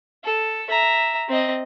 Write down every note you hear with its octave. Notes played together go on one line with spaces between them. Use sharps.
A4
E5 A#5
C4 D#5